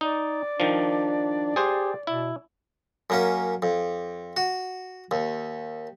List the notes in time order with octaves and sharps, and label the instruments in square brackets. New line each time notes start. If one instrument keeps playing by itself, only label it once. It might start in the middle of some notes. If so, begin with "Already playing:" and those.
[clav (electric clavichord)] D#4 [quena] D5
[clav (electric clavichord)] D#3 F3 [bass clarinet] D4
[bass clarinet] G4 [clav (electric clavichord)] G#4 C5
[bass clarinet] B2 [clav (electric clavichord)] E4
[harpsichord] F#2 A#3 C#4
F2
F#4
D#2